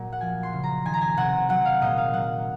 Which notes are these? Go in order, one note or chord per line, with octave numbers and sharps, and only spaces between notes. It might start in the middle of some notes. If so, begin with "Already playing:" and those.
Already playing: A#2 F#3
F#5
F3 G#5
C6
C#3
A#5
D#3 G#5
A#5
G#5
C3 F#5
F#3 F#5
F5
A#2 D#5
F5
F#3 F#5